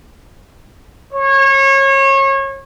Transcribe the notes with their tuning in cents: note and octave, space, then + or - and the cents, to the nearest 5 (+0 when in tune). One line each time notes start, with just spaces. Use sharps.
C#5 -30